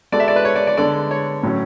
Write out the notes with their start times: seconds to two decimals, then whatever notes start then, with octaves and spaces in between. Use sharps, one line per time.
0.12 G#3 B3 F#4 A4 D5
0.20 E5
0.28 D5
0.36 B4
0.45 C#5
0.56 D5
0.67 D5
0.77 D3 G#3 B3 D4 A4 D5
1.11 C#5
1.43 A2 F#3 C#4